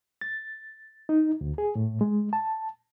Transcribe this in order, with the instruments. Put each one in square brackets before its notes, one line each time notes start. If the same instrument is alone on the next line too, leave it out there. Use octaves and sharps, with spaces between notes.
[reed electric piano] A6
D#4
D2
G#4
A2
G#3
A5